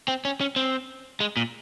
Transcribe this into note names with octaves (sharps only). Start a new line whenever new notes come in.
C4
C#4
C#4
C4
G#3
A#2